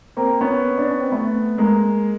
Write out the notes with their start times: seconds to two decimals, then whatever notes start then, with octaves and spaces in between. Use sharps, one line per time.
0.17 A#3 C4
0.41 B3 C#4
0.78 D4
0.88 C#4
1.00 C4
1.12 A3 B3
1.58 G#3 A#3